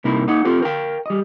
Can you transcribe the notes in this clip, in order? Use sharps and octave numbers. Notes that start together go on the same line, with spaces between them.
C2 C3 A#3 D#4 E4 E5
A#3 D#4 D#5 F#5
C4 F4 G4 A4 C5
A#4 F5 G5
G3 D#5